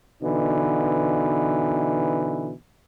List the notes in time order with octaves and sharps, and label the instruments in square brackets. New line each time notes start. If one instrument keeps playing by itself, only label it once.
[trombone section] B2 D3 E3 D#4